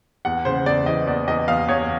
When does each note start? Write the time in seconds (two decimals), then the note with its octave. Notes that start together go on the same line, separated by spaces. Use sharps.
0.25 E2 F#5
0.45 C#3 C5
0.66 E2 D5
0.86 E3 D#5
1.07 E2 D5
1.28 E2 D#5
1.48 E2 F5
1.68 E2 C#5